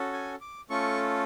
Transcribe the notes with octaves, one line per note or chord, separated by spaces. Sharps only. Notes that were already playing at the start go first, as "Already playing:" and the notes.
Already playing: C#4 F#4 A4
G#5
D6
A3 C#4 F4 A4 C#6